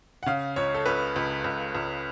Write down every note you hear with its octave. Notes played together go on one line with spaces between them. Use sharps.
F#5
C#3 F5
C#2 C#5
A4
C#2 B4
C#2
C#2
C#2